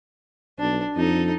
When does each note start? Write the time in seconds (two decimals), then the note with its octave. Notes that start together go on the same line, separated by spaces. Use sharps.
0.59 B1 D4
0.96 F2 D#4 A4